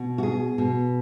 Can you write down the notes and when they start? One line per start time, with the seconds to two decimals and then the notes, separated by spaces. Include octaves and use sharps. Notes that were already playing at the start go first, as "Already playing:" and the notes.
Already playing: B2
0.18 F#4
0.23 G#4
0.58 B2